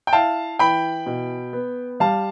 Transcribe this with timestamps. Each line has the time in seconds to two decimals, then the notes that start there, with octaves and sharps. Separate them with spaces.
0.07 G5
0.13 E4 F5 A5
0.59 E3 G5 B5
1.06 B2
1.53 B3
2.00 G3 F5 A5